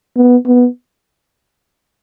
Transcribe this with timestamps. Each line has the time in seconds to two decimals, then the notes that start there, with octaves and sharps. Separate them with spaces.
0.16 B3
0.46 B3